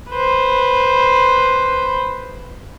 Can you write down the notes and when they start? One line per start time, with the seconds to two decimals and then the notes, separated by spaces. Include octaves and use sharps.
0.11 B4 C5